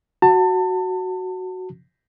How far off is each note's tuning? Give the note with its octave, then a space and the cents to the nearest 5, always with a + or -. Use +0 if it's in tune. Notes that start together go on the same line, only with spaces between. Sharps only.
F#4 +0 A5 +30